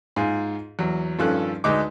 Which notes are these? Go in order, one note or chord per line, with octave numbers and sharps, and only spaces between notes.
G#2 F4 G#4
E2 F#3
G2 D#3 F3 C#4 A4 F#6
D2 G#3 D#4 B4 D6